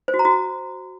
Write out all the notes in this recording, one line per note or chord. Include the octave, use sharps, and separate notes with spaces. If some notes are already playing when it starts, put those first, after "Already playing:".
C5
F#4
A#5
F#4